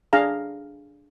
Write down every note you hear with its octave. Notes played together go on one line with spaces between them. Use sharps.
D4 G#4 F5 A#5